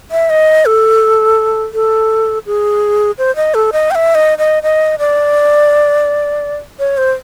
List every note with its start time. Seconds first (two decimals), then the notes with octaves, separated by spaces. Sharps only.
0.11 E5
0.30 D#5
0.66 A4
1.74 A4
2.46 G#4
3.18 C5
3.36 D#5
3.54 A4
3.73 D#5
3.91 G5
3.95 E5
4.15 D#5
4.38 D#5
4.63 D#5
4.99 D5
6.79 C#5
6.97 C5